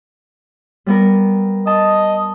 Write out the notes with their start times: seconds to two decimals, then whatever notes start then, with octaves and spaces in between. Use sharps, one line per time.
0.86 G3 B3 A#4
1.67 D#5 A5